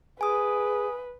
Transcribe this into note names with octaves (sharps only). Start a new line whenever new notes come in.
G#4 B4 G#5 D#6